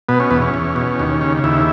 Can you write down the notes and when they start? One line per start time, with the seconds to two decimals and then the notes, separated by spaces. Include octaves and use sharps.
0.09 B2 B3
0.20 C#4
0.31 E2 B3
0.42 C#4
0.54 E2
0.76 B2
0.99 D#2
1.21 C#3
1.44 D#2 E4